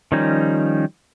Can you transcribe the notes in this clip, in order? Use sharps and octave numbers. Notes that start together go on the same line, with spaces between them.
D#3 F3 G3 C#4 D#4